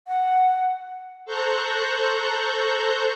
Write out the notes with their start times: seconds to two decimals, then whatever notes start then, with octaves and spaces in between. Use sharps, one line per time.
0.07 F#5
1.25 A4 C5 A#5 C#6 F#6 G6